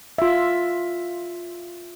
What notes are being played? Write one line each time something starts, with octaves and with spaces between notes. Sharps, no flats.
F4 E5